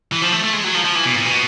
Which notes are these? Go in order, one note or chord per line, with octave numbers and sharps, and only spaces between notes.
E3
F3
A3
A3
G#3
F#3
F3
F3
E3
B2
A#2
B2